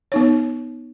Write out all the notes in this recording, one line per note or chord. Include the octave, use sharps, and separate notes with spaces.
B3 D#4 C#5